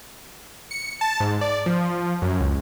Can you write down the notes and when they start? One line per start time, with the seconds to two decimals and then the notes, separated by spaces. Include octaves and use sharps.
0.71 C#7
1.01 A5
1.20 G#2
1.41 D5
1.66 F3
2.22 F#2
2.40 C#2